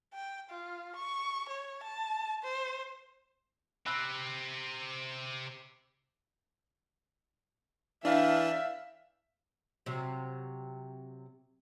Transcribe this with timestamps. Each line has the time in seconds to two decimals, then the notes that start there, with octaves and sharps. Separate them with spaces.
0.14 G5
0.50 F4
0.96 C#6
1.49 C#5
1.83 A5
2.43 C5
3.86 C3 C4 B5 E6 F#6
8.05 E3 D4 E5 F5 G5
9.86 C3 F#3